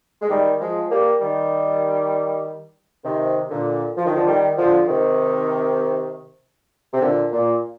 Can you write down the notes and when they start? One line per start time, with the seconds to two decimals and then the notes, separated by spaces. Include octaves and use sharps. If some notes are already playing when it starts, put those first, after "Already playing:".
0.22 G#3
0.29 D#3 G3
0.60 F3 G#3
0.90 G3 A#3
1.21 D#3 G3
3.05 C3 D#3
3.50 A#2 D3
3.97 F3
4.06 D#3
4.15 D3 F3
4.26 D#3 G3
4.57 D3 F3
4.88 C3 D#3
6.93 C3
7.02 A#2 D3
7.32 A#2